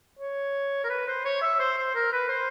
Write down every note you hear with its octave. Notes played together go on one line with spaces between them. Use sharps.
C#5
A#4
B4
C5
C#5
E5
C5
C5
A#4
B4
C5